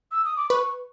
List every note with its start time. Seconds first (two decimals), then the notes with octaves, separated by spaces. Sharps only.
0.12 E6
0.25 D#6
0.37 D6
0.50 B4 C#6